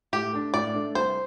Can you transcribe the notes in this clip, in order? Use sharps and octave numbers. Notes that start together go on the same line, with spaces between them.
A2 G4
A3 D4
A2 D5
A3 D4
C2 C5